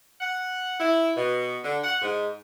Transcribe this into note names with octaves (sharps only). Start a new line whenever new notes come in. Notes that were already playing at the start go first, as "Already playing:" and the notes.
F#5
E4
B2
D3
F#5
G#2